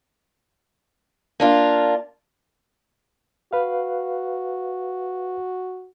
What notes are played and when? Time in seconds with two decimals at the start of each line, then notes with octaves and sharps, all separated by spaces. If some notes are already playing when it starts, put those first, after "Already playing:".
1.40 A#3 D4 F4
3.53 F#4 B4 F5